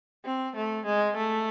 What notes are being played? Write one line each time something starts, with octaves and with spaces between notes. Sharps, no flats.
C4
A3
G#3
A3